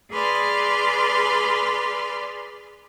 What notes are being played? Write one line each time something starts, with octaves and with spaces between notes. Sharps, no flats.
G#4 B4 D5 C6 F6